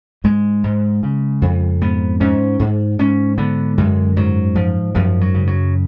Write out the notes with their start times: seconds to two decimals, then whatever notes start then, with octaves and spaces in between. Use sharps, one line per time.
0.24 G#2 G#3
0.64 G#2
1.03 C#3
1.42 F2
1.81 G#2 B3
2.20 G#2 C#4
2.59 G#2
2.99 G#2 C#4
3.38 D3 B3
3.78 F#2 G#3
4.17 G#2 F#3
4.55 G#2 F3
4.95 F#2 F3
5.21 F#3
5.34 C#3
5.47 F#3